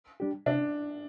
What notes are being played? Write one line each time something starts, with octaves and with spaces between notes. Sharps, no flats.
G3 D4 G4
C3 D4